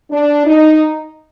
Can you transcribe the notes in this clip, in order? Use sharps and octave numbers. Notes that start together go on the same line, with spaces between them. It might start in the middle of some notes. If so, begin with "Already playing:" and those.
D4
D#4